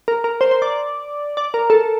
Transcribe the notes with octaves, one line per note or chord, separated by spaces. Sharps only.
A#4
A#4
C5
C5
D5
D5
A#4
A4